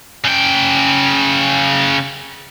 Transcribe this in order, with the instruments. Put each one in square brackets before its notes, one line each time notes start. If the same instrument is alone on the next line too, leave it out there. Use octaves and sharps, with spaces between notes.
[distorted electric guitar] C#3 G5